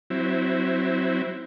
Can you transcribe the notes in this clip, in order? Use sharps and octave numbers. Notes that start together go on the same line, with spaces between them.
F#3 C4 E4